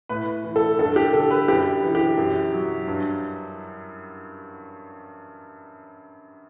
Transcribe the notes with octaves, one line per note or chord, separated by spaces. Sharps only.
A2 B4
E3
A4
G2 A4
G4
D3 A4
B4
F#2 G4
E3
G4
F#2
F#3
G2